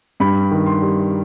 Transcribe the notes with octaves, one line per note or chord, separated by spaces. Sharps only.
G2 B5
D#3
C6
G3